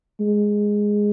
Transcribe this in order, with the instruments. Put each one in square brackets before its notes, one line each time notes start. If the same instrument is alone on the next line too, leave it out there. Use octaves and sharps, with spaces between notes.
[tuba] G#3